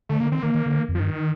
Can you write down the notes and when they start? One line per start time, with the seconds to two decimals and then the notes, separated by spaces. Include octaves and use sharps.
0.09 D3 A3
0.20 D3 A#3
0.32 D#3 C4
0.43 D#3 A#3
0.54 D#3
0.66 D3
0.77 D#3
0.89 F2
0.95 F3
1.00 G2 D#3